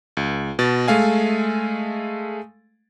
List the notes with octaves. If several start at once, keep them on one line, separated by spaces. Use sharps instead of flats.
C#2
B2 A6
G#3 A3 F5 G#5